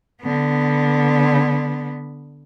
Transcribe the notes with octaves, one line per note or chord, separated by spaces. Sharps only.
D3 B3